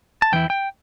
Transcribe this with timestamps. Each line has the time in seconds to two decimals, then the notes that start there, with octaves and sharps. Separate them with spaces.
0.22 A5
0.32 E2 E3 E4 G5
0.50 G5